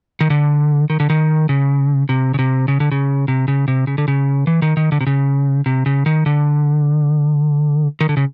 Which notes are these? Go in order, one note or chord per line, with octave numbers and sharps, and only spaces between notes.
D#3
D3
D#3
D3
D#3
C#3
C3
C#3
C3
C#3
D3
C#3
C3
C#3
C3
C#3
D3
C#3
E3
D#3
D#3
D3
C3
C#3
C3
C#3
D#3
D3
D#3
D3
C#3